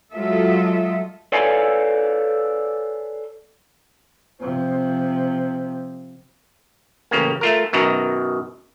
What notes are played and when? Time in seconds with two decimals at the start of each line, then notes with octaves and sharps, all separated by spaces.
0.12 F#3 G#3 F4 A4 D#5 E5
1.32 A4 B4 C#5 D5 F5 G#5
4.41 C3 F3
7.11 A1 C#3 A#3
7.41 A3 F4 A#4
7.73 F#2 B2 D#3 A#5